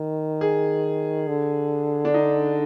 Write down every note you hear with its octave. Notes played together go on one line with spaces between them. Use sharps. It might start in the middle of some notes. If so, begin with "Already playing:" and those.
Already playing: D#3
G#4
D3
D4
D#4